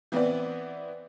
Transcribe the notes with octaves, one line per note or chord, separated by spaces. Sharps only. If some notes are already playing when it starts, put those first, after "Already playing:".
E3 B3 C4 E4 B4 D5